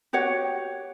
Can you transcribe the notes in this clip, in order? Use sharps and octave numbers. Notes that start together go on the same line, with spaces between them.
F#4 G4 C#5 F#5